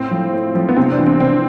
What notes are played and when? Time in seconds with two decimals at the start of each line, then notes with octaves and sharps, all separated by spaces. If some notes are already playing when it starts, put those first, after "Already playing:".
Already playing: A2 C4
0.11 F3
0.33 A2
0.55 F3
0.69 B3
0.76 C3 C4
0.92 D4
0.98 E3
1.06 C4
1.20 C3 C4